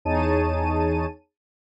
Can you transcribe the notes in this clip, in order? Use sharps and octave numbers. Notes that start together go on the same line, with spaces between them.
E2 D#4 G#4 C#5 A5 D#7